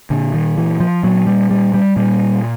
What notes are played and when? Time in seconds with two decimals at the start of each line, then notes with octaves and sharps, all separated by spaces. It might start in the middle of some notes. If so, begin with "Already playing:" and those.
0.10 A#2 D3
0.34 D#3
0.58 E3
0.80 F3
1.03 A#2 F#3
1.27 G3
1.50 G3
1.74 G3
1.96 A#2 G3